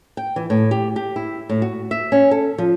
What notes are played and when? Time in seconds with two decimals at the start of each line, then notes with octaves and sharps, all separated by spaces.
0.17 G5
0.36 E3
0.50 A2
0.71 G4
0.96 G4
1.16 E4
1.49 A2
1.62 F#4
1.91 E5
2.12 C#4
2.31 A4
2.58 F3